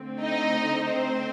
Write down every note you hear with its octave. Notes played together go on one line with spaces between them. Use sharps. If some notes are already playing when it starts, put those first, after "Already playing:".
Already playing: D3 A3 C4
D#4 D#5
C4 C5